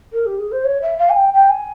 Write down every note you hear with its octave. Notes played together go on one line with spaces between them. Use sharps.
A#4
G4
G#4
C5
C#5
E5
F5
G#5
G5
G5
G#5